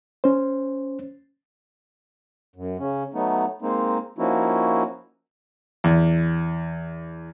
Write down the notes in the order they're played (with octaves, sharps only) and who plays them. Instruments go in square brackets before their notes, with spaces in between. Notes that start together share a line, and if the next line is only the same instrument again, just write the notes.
[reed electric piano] C#4 C5
[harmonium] F#2
C#3 C#4
F#3 A3 B3 D#4
G#3 A#3 C4 D#4
F3 A#3 C#4 D#4 E4 F#4
[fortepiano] E2